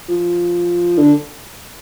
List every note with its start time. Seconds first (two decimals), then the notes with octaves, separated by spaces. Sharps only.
0.09 F3
0.98 D3